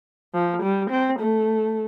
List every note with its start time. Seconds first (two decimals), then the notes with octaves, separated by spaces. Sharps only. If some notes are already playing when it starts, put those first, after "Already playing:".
0.34 F3
0.62 G3
0.90 C4
1.19 A3